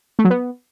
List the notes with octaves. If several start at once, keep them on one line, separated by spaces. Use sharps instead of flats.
A3
F#3
B3